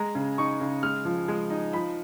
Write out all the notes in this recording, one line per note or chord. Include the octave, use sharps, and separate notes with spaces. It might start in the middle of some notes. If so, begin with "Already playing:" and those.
Already playing: G#3 A#5
C#3
D#4 C#6
C#3
G#3 F6
F3
G#3
D#4
F3 B5